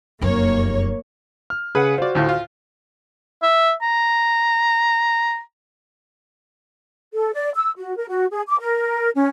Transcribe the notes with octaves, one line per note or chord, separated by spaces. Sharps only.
F1 F#2 A#3 C#5
F6
C#3 G#4 B4 F#5
F4 F#4 C5 D5
D2 A2 F4
F4
E5
A#5
A4
D5
E6
F#4
A#4
F#4
G#4
D6
A#4
C#4